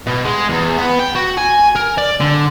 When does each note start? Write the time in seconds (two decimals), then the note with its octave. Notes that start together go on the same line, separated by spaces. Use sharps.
0.07 B2
0.25 G#3
0.49 E2
0.78 B3
1.00 G5
1.15 F#4
1.37 G#5
1.75 A#4
1.98 D5
2.20 D3